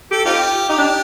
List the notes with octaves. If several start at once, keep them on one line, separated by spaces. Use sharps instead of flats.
G4 A4
C4 D#4 F4 G4
D#4 G4
D4